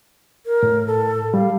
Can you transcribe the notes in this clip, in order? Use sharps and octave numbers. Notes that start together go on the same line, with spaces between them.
A#4
A2
A4
G3 F5